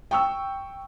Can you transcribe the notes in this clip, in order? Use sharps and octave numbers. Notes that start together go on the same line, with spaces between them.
G5 C#6 E6